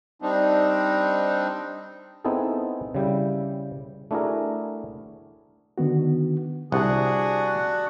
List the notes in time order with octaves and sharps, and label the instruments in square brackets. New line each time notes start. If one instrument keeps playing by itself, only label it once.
[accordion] G3 C4 D4 D#4
[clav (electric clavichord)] B3 C4 D#4 E4 G#4 A4
C#3 G3 E4 G5
A3 D4 E4 F#4 G#4 A#4
[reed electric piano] D3 D#3 B3 F#4
[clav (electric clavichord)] C2 [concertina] D4 F#4 F#5 [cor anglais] G#4